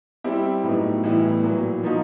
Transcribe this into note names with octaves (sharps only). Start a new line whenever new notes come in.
G3 C4 E4 G4
A2 F#3 B3 D#4
A2 E3 G3 B3 E4
A#2 F#3 B3
F3 A#3 D#4 F#4